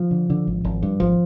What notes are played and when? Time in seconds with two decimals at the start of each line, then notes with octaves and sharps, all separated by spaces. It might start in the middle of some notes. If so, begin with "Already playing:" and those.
Already playing: F3
0.11 D3
0.30 D3
0.47 G#1
0.65 G#1
0.83 G2
1.00 G#1 F3